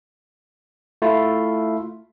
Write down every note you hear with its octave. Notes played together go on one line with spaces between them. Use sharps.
A3 E4 F4